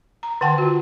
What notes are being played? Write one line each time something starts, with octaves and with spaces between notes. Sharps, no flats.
A#5
D3 D#3 F#5 G5 A5
F4 F#4